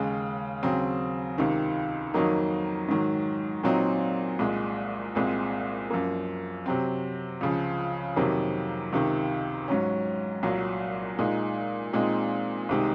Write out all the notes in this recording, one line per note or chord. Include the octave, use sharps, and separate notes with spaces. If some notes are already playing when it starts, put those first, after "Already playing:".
Already playing: D#2 C#3 G#3
D#2 C#3 F#3 C4
C#2 C3 D#3
F2 D#3 F#3 A#3 D#4
G#2 D#3 F#3
A#2 F#3 C4 D#4
C2 A#2 G#3
C2 A#2 G#3 C4
F#2 F3 A#3
C3 F#3 C4
C#2 C#3 F3
F2 C3 D#3 F#3 A#3
C#2 C3 D#3
G#2 F#3 C#4
C2 A#2 F#3
A#2 G#3 D#4
A#2 G#3 C4 D#4
C2 C3 D#3 G#3 D#4